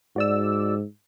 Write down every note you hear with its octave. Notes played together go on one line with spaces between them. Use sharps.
G#2 F#4 D5 E6